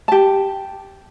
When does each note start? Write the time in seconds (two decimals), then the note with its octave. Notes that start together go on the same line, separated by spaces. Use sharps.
0.08 G4 A5